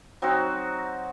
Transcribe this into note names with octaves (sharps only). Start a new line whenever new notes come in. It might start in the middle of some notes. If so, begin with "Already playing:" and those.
F#3 C4 D#4 F#4